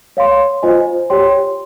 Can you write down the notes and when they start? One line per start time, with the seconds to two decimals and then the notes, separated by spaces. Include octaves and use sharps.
0.17 C#5 F5 C6
0.63 F4 C5 D#5 G#5
1.10 G4 C#5 G5 C6